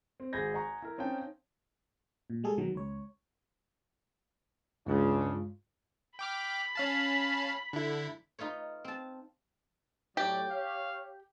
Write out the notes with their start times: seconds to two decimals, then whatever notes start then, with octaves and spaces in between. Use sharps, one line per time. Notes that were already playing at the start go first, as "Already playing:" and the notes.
0.20 C4
0.33 G#1 G#4 B5 G6 G#6 A#6
0.54 D#5 F#5 G#5 A#5 C#6
0.82 E4 A#4
0.98 C4 C#4 D#4 F5 G5 A5
2.30 A#2
2.44 G3 G#3 G#4 A4
2.58 B1 B2 D#3 F#3
2.75 C#2 C#5
4.87 C#2 G2 C#3 G#3 D4 F4
6.19 G5 B5 D6 F6
6.75 C#4 F5 A5
7.73 D3 E4
8.39 D#4 F4 B4 C#5
8.84 C4 A5
10.17 A2 F#3 G4 D5
10.51 C#5 F5